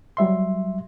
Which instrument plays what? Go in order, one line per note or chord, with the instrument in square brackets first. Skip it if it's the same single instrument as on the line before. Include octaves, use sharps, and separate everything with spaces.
[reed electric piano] F#3 G3 E5 C6